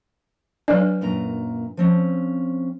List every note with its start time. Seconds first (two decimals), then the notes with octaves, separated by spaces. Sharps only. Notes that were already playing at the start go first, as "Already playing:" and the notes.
0.68 F#3 D4 B4 C#5 D5
1.01 F#2 A#2 A#5
1.77 F3 C4 C#4